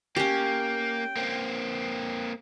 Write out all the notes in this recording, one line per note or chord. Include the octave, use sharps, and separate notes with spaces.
A#3 C#4 G4 G5
A#3 C4